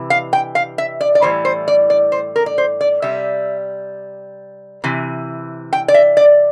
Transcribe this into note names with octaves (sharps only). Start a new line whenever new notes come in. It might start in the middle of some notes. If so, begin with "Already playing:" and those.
Already playing: C3 E3
F5
G5
F5
E5
D5
D5
A2 E3 G3 C5
C5
D5
D5
C5
A#4
D5
C5
D5
C3 G3 E5
C3 E3
G5
D5
E5
D5